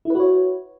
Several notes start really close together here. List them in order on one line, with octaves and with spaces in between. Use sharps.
E4 B4 F#4 C#5